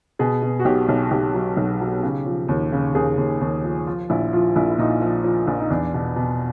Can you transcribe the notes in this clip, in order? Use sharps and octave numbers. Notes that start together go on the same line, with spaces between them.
B2 G#4
B2
F#4
B1 G4
B1
B1 G4
F#3
B1
F#3
C#3
F3
D#2
C#3
D#2 G#4
D#2
D#2
F3
F3 F4
A#1 E4
F3 F4
A#1 E4
E4
A#2 D#4
F3
F3
A#1
D#4
E2 D4
B2
B2